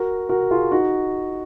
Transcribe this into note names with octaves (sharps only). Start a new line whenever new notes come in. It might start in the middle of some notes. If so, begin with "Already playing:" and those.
Already playing: F#4 A#4
F#4 A#4
F4 G#4
D#4 F#4